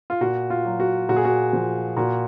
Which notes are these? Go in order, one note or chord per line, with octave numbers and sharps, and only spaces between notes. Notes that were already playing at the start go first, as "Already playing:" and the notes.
F4
A#2 F#4
F4
F#3
F#4
A#2 F#4
G#4
F#4
F3
A#2 F#4